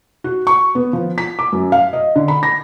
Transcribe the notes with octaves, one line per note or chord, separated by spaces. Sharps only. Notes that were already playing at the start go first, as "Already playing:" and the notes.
F#4
C#6
B3
F3
B6
D6
F#2
F5
D#5
D3
B5
A#6